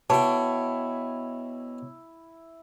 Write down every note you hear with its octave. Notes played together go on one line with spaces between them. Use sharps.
B2 E4 C#5 G5 A5 D6